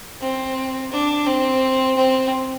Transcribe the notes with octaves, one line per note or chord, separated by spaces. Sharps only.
C4
D4
C4
C4